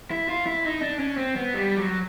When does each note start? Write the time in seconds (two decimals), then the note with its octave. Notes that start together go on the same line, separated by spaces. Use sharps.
0.11 E4
0.29 F4
0.46 E4
0.65 D#4
0.82 D4
0.99 C#4
1.18 C4
1.36 B3
1.54 G3
1.77 F#3